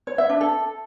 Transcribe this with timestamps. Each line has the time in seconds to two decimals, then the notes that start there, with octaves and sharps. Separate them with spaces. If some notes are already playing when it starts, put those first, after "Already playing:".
0.07 C#5
0.18 E5
0.29 D4
0.41 A4